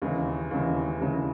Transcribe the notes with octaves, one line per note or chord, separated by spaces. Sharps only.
D#2 C#3 E3
D#2 C#3 E3
D#2 C#3 E3